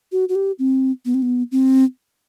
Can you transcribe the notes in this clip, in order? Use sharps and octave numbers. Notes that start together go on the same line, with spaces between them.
F#4
F#4
G4
C4
B3
C4
B3
C4